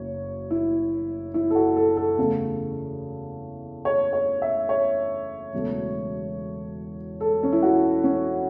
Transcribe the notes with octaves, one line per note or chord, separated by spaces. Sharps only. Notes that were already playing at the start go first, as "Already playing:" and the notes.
Already playing: F#1 F#2 C#5
E4
E4
A4
F#4
A4
A4
E2 C#3 A3
C#5
C#5
E5
C#5
E1 E2 C#3 F#3 A3
A4
C#4
E4
F#4
C#4